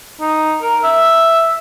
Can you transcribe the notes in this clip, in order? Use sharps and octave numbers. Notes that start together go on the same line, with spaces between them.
D#4
A#4
E5